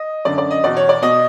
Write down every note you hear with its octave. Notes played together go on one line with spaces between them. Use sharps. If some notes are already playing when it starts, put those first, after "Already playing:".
Already playing: D#5
F#2 D3 D5
D5
D#5
E2 B2 D5
C#5
D5
B2 D#5